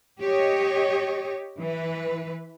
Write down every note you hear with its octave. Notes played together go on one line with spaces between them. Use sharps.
G4 C#5 D#5
E3 B4